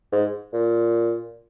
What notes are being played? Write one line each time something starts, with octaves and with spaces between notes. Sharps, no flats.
G#2
A#2